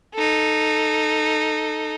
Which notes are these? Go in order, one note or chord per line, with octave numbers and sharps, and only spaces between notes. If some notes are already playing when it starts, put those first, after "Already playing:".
D#4 A4